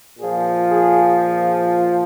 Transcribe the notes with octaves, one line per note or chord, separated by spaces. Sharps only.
A#2 F3 G#4
G#4